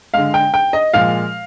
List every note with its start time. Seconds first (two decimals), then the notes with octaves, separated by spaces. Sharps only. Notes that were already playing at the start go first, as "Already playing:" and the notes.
0.14 D3 G#3 F5
0.34 G5
0.54 G5
0.73 D#5
0.94 A#2 F3 G#3 F5